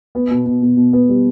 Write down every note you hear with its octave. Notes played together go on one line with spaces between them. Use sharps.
B3
B2
B2
B2
B2
B3
G3